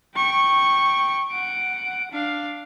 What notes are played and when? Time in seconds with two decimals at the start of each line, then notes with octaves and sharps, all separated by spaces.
0.16 G5 C#6
1.31 F#5 D7
2.11 D4 F5